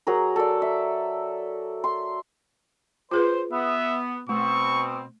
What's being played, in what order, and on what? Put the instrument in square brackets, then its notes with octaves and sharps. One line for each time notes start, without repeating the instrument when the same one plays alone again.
[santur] F#3 G#4 A#4
A4 D5
E5
C6
[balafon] F4 G#4 B4 [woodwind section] C5
[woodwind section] B3 [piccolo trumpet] E5
[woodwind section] B2 C4 [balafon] A3 [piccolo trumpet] C#6